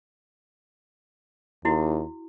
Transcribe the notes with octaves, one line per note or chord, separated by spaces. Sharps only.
D#2 E4 F#4